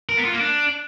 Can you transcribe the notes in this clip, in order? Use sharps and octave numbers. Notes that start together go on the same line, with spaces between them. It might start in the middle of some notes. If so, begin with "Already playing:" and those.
A#4
B3
F4
A#3
D4